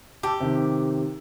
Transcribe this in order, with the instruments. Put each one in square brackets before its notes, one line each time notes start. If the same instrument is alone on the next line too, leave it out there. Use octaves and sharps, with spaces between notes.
[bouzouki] G4 [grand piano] A5 E6
[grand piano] C3 D#3